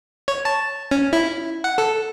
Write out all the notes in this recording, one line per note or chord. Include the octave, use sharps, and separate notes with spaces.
C#5
A5
C#4
E4
F#5
A4